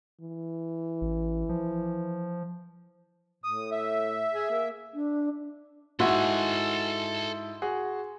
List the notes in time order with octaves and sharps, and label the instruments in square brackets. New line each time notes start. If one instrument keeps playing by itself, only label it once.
[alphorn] E3
[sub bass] A1
F3
[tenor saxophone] A2 [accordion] D#6
[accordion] E5
[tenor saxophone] G#4
A#3
[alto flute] D4
[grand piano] G#2 E4 [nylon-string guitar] F#4 [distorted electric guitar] A4 G#5 [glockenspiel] C6
[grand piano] F#4 G#4